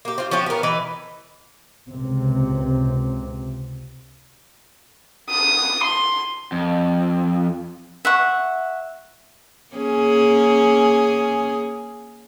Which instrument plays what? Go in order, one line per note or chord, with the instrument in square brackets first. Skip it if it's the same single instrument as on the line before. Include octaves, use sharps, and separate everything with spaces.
[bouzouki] A#3 G4
C4 F4
F3 C#4 F#4 G4
B3 A#4
E3 B4 D#5
[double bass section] C#2 C3
[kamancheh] D#6
C6
[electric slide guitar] F2
[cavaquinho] E5 F#5 C#6
[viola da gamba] A#3 C#4 G#4